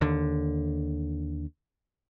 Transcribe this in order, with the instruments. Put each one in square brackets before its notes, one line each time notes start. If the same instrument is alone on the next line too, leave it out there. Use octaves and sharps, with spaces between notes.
[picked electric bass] D#2 D3